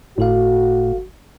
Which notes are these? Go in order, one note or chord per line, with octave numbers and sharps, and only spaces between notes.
G1 A2 F#4 A4 F5